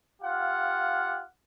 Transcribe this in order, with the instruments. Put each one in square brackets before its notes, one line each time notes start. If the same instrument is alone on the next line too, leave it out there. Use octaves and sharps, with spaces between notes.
[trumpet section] F4 G4 F5 F#5